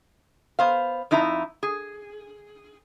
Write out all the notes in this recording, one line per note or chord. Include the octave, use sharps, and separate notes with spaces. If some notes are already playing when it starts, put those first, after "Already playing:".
B3 C5 F5
F2 D#4 E4 A5 A#5
G#4